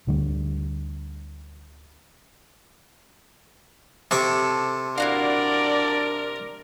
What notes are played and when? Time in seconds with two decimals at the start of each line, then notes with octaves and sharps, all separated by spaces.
0.07 D2 D3 G3 A3
4.11 C3 A4 C#6 D6
4.98 D4 E4 F#4 A#4 D5 F5